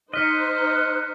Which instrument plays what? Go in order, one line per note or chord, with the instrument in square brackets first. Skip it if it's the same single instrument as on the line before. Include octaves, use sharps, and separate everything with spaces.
[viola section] D#4 C5 [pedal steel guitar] D#5 [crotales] F6 B6 C#7 [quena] F#6